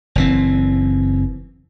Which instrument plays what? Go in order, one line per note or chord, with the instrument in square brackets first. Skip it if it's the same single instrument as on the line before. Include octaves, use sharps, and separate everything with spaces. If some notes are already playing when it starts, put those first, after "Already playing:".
[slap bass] F#1 E3 C4